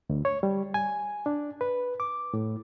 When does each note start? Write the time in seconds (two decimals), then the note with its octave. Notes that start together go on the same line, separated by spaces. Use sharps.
0.10 D2
0.25 C#5
0.43 G3
0.74 G#5
1.26 D4
1.61 B4
2.00 D6
2.34 A2